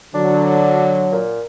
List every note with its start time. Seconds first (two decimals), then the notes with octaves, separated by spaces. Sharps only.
0.14 D3 F#3 D4
1.12 A#2